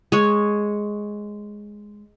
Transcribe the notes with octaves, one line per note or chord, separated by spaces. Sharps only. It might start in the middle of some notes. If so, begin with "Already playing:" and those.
G#3 C#5